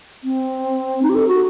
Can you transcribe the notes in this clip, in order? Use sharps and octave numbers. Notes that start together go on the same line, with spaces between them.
C4
D#4
G4
A4
F#4